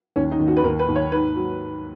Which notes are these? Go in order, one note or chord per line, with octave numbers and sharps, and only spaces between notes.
D#2 C#4
D#4
D#2
F#4
B4
D#2 A#4
B4
D#2
C#5
G#2 B4
F#3